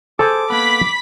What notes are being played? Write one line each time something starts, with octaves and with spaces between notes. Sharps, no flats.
G#4 A4 C5 G#5 A5 D6
A#3 B3 B5 B6